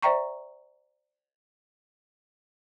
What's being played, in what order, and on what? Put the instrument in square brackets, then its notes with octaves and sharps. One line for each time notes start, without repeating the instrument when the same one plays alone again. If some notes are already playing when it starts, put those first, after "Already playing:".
[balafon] C5 D5 E5 G5 A#5 C#6